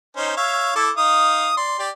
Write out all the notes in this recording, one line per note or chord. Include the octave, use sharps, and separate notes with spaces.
C#4 D#4 C5
C#5 E5 F5
E4 A4 D6
D#4 F5 D#6
D5 C6
G4 D5